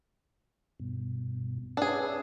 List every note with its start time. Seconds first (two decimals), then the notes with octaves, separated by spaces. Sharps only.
0.80 G2 B2
1.77 C#4 D4 G#4 B4 E5